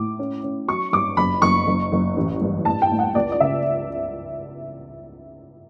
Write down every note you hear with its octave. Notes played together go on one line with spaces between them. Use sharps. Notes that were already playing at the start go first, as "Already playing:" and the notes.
Already playing: A2 D6
C#4
C#4
F#3 C#6
G2 D6
F#1 B5
F#1 C#6
F#1
F#1
A1
G2
A2 A5
G5
A2
F#5
C#2 D5
D5
C#3 E5